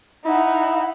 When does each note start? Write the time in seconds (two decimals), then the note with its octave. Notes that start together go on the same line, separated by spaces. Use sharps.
0.25 D#4 E4 F#5